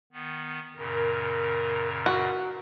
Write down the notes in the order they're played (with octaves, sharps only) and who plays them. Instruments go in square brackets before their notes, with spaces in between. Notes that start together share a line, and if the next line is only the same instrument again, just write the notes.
[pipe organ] D#3 B3
[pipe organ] F#2 A#2 C#3 [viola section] A#4
[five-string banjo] F#4